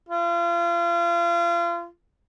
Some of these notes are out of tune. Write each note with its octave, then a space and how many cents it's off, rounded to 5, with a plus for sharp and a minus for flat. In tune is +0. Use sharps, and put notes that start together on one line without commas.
F4 -35